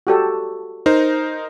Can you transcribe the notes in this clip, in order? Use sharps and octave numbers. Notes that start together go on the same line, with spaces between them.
F#4 G4 A4
D#4 A#4 C5